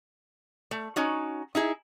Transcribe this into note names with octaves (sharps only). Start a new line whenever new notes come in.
A3
C#4 D#4 F#4
D#4 E4 G#4